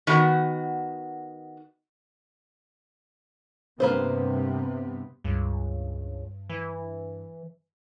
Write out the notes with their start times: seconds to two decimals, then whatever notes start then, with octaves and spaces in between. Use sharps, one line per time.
0.07 D#3 B3 F#4
3.80 G2 C3 A#3 B3 B4 C5
5.24 C#2 G2
6.50 E3